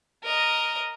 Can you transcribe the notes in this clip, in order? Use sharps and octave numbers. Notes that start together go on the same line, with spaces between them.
A#4 D#5